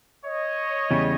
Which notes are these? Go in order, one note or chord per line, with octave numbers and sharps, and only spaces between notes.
C#5 D#5
E2 C#3 G3